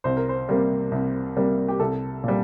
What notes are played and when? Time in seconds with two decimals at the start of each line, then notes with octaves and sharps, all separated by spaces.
0.04 C2 C5
0.17 A#4
0.29 C5
0.49 C3 G3 A#3
0.92 C2
1.36 C3 G3 A#3
1.68 G4
1.80 C2 A4
2.24 A#2 G3